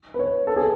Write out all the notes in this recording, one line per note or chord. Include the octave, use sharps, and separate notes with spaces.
B4
C#5
A4
G#4